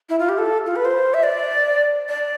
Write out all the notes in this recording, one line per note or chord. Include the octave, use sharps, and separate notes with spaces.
E4
F4
G4
A4
F4
B4
C5
E5
D5
D5